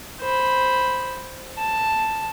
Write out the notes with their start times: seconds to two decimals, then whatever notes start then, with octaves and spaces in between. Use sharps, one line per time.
0.21 C5 B5
1.58 A5